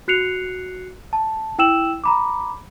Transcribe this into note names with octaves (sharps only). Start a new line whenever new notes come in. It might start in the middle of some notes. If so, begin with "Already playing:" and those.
F#4 F#6 C7 C#7 F7
A5
E4 G5 E6 E7 F#7
A#5 B5 D6